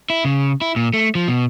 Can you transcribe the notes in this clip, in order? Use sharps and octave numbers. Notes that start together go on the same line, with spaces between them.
E4
C#3
E4
A#2
A3
F3
B2